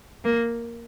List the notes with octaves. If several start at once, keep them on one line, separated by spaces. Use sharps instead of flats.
A#3